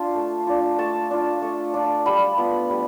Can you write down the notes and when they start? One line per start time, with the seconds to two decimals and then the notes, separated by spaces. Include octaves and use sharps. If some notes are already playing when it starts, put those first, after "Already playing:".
Already playing: D4 F4 C6
0.15 A3
0.47 D4 F4
0.78 A3 A5
1.11 D4 F4
1.42 A3
1.74 D4 F4
2.06 G3 B5
2.38 B3 F4
2.70 G3